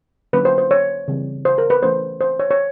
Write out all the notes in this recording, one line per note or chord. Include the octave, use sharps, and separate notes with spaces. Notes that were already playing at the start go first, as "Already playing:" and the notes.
D3 F#3 A#3 C#4 B4
C5
C5
C#5
C#3 E3 G3 C4
C5
A#4
B4
E3 A3 C#4 C5
C5
C#5
C#5